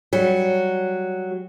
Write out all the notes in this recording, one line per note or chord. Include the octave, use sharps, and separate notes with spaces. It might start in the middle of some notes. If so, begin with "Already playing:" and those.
F#3 G3